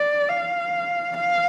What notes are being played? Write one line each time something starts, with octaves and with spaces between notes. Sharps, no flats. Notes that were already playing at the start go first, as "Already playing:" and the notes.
Already playing: D5
F5
F5